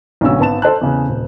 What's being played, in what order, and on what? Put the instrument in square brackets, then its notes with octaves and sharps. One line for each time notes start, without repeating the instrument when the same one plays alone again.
[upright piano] B1 G#2 D3 C#4 F#4 E6
G#1 B3 A5 E7
A4 C5 A5 F#6
E2 C#3
D#1